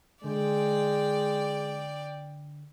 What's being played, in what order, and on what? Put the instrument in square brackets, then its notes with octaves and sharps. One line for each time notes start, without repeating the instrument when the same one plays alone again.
[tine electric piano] D3 [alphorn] G#3 [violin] D5 G5